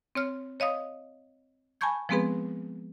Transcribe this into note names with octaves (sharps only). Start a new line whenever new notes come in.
C4 C#5 F6
C#5 D#5 F5 D#6
G#5 A5 B5 C#6 G6 G#6
F3 G#3 B3 C4 G#4 B4